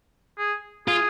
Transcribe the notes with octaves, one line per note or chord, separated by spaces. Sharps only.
G#4
F4 G#4